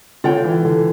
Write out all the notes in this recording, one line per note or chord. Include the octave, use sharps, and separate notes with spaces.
D3 F4 C#5 G5
E3
D3